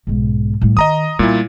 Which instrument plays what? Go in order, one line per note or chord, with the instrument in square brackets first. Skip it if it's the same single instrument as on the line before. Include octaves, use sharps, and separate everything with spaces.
[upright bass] B1 G#2
A2 G3
[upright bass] D#3 [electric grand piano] D#5 A#5 D#6
[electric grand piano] A#2 E4 [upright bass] G3 B3